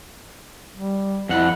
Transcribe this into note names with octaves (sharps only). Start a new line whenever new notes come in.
G3
F2 E4 F#5